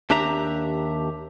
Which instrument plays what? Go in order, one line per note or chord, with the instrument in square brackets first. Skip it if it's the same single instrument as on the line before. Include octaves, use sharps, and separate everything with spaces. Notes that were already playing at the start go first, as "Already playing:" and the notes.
[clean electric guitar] D#2 D4 G4 E5 A#5